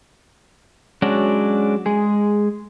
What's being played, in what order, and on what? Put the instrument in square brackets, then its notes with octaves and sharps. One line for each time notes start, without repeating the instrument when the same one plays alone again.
[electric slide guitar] F#3 G#3 C#4 D4 F#4
G#3 G#4